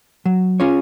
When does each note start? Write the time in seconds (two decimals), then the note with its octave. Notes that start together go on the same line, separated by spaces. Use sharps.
0.26 F#3
0.60 C#4 F4 G#4 C#5